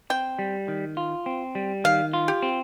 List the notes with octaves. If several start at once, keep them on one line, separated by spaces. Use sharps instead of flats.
C4 G5
G3
D#3
F4
C4
G3
D#3 F5
F4
G4
C4